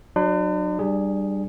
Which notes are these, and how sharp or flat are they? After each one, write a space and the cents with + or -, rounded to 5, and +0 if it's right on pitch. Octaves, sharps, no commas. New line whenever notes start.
F#3 +0 D4 +45 B5 +45
G3 +0 D4 +40 G#4 +0